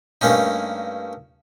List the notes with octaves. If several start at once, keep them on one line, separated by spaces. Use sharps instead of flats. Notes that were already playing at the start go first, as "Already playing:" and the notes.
G2 A3 A#3 C#4 D#4